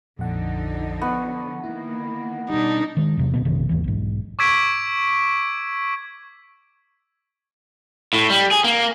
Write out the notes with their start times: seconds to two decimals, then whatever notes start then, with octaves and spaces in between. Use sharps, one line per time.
0.19 A#1 F2 D3 F3 D#4 F#5
1.02 B3 C#6
1.64 D#3 A#3 E4
2.50 B2 D#3 G3 D4 D#4
2.97 D#3 G#3
3.17 E2 C3 F#3
3.34 D2 B2 B3
3.45 A#1 F#2 C3 D#3
3.69 D#2 G#2 E3
3.84 B1 G#2
4.39 C#6 D6 E6 G#6 B6 D7
8.13 A2
8.30 G3
8.51 G#4
8.64 A#3